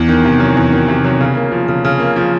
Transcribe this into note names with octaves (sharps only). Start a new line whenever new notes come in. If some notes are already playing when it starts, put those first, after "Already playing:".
Already playing: E2
D#3
C3
F#3
E2
D#3
C3
F#3
C#3
A#3
F3
C#3
C#3
A#3
F3